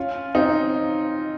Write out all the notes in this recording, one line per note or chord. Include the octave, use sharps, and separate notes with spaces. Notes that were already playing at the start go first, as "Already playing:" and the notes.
Already playing: C#4 F4
C4 D#4